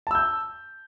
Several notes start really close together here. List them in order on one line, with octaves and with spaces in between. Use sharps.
A5 E6 G6